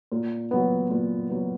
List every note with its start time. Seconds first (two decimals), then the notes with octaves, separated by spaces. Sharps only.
0.12 A#2
0.51 F#3 B3
0.90 A#2
1.30 F#3 B3